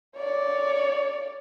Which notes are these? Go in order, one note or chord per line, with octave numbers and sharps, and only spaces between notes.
C#5 D5